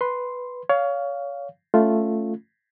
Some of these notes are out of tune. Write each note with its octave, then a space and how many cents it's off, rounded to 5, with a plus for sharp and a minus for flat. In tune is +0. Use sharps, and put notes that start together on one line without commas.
B4 +0 C6 +0
C#5 +25 F5 +0
A3 +0 C#4 +0 F4 +0